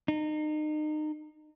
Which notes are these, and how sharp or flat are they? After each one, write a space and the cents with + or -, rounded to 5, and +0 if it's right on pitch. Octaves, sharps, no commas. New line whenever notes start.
D#4 -30